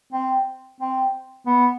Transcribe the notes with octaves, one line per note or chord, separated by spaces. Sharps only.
C4
C4
B3